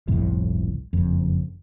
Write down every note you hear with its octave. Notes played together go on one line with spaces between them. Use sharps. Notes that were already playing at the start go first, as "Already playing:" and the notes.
G1 C2 F2 A2
F#1 F2